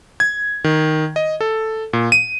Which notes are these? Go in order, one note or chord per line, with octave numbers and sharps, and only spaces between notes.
G#6
D#3
D#5
A4
A#2
D#7